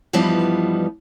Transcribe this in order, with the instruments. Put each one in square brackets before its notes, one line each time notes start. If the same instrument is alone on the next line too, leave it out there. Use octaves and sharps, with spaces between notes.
[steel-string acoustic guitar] G2 E3 F3 G3 B3 D#4